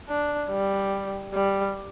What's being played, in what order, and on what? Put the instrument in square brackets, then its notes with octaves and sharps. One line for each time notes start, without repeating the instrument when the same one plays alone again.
[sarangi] D4
G3
G3